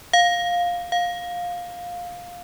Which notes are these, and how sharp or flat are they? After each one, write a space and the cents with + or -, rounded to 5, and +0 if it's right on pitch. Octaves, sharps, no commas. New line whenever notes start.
F5 +10
F5 +15